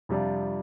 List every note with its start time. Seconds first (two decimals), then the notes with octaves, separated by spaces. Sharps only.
0.09 F2 C3 G3 D4 F4